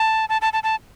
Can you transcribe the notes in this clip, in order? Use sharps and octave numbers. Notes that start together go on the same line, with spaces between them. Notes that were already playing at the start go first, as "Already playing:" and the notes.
Already playing: A5
A5
A5
A5
A5